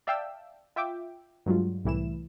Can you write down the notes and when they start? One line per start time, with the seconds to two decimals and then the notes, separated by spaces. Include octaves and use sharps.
0.07 D5 E5 F5 G5 A5 E6
0.76 F4 E5 G5 D6
1.46 G2 F#3 G#3 F4
1.84 C2 A2 E3 E4 E7